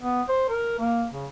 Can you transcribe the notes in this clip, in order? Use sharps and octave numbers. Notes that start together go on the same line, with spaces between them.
B3
C5
A#4
A#3
C#3